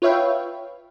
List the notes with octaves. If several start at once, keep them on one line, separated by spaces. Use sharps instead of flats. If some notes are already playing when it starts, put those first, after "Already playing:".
F4 B4 C#5 E5 F5 G5